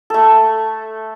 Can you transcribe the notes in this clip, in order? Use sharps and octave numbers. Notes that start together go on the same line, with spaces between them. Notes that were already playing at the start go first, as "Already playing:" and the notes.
A3 A4